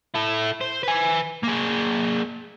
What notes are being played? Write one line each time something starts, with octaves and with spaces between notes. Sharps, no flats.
E4 A4
C5
B4 G#5
A#3 G#4